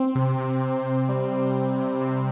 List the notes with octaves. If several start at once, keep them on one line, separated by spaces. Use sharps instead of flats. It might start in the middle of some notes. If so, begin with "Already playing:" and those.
Already playing: C4
C3
C3
C3
C3
G3
G3
G3
C3
C3